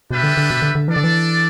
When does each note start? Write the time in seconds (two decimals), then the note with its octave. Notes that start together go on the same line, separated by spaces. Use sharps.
0.11 B2 G3 D4 B4 E5 G5
0.23 D3
0.37 D3
0.50 B2
0.62 D3
0.75 D3
0.88 E3 D4 A4 D5
0.96 D3
1.04 E3